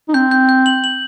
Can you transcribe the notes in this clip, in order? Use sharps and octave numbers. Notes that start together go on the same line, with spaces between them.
D#4
C4 G6
G6
G6
F#7
F#7